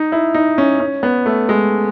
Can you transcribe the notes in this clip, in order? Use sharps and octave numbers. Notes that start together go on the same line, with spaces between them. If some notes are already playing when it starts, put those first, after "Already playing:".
Already playing: D#4
E4
D#4
C#4
C#4
B3
A3
G#3